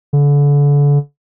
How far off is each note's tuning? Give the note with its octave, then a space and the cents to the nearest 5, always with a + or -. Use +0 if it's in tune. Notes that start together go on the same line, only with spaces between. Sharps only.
D3 -35